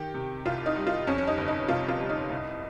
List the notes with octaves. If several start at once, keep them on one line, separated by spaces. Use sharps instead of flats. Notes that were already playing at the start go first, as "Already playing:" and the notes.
Already playing: D#3 G4
C3
C2 F4
D#4
G3
F4
F2 C#4
C#4
D#4
G1
D#4
C3 F4
F4
G3
D#4
C2